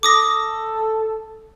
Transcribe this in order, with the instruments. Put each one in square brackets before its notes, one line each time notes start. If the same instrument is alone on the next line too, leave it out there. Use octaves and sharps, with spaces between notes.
[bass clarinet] A4 [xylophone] D6 D#6 A#6